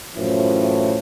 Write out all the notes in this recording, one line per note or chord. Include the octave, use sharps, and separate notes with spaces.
F#2 A2 E3 F3